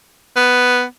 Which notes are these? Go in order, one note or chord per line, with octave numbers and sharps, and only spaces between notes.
B3